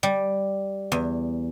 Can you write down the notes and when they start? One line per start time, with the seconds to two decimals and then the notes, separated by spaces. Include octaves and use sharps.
0.03 G3
0.92 E2